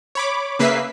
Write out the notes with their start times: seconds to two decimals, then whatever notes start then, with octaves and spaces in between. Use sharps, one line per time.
0.15 C#5 B5 D6
0.59 C#3 A#3 B4 E5 B6 C7